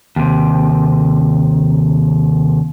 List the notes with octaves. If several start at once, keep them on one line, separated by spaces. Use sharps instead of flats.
D#2 C3